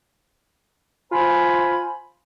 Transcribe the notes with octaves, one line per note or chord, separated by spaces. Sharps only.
F4 C5 G#5 B5